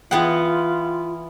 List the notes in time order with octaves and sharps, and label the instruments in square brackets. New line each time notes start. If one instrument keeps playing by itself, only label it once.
[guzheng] E3 B3 F#5 [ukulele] E4 G#4 G5 [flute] F4